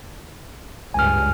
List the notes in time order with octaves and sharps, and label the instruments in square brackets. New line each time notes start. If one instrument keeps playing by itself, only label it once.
[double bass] C#2 G2 [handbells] G#5 F6